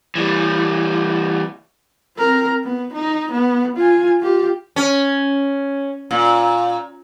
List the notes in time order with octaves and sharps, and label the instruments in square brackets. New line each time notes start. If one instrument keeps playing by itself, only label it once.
[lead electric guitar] E3 G3
[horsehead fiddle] C4 A#4
B3
D#4
B3
F4 G#5
F4 G4
[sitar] C#4
A#2